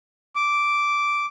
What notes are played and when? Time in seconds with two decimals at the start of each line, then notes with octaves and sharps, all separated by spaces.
0.36 D6